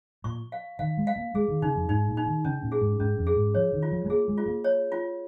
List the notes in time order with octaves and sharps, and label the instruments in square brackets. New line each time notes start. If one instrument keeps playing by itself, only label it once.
[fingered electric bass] A#2 [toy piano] C#6
[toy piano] F5
[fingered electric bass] D#3 [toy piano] F5
[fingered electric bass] G#3
[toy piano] F5
[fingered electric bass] A#3
[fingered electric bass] G#3 [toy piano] G#4
[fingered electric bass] D#3
[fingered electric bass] C#3 [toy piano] D#4
[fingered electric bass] F2
[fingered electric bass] G#2 [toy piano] D#4
[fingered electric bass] A#2
[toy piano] D#4
[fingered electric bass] D#3
[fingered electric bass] C#3 [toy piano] C#4
[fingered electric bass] A#2
[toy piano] G#4
[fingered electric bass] G#2
[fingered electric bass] G#2 [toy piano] C#4
[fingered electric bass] F2
[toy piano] G#4
[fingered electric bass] G#2
[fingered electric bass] F3 [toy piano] C#5
[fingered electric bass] D#3
[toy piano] F4
[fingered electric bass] F3
G#3
[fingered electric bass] A#3 [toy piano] G#4
[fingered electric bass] G#3
[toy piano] F4
[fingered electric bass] A#3
[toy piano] C#5
F4